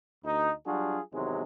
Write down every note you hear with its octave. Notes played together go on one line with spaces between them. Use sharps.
D2 D#4
F#3 G3 D4 F4 F#4 G#4
E2 C3 D#3 F#3 G#3